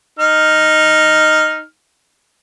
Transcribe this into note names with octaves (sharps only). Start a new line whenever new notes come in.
D#4 F6